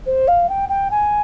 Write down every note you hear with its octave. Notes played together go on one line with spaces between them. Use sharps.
C5
F5
G5
G5
G#5